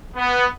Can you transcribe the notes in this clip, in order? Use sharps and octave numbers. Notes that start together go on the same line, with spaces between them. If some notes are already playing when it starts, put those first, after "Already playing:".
B3